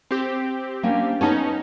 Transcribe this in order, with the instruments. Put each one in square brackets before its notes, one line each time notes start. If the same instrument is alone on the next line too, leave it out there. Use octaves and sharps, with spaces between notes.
[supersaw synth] C4 G4
[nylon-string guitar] A#3 C#4 D4
[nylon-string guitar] B3 C#5 A5 [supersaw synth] C#4 D#4